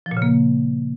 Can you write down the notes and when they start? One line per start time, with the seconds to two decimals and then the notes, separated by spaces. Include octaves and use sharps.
0.06 F3
0.11 A#2
0.17 C#3
0.22 A#3